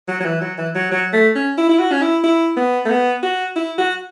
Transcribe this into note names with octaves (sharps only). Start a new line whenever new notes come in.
F#3
F#3
E3
F#3
E3
F#3
F#3
A3
C#4
E4
E4
F#4
C#4
E4
E4
B3
A3
B3
F#4
E4
F#4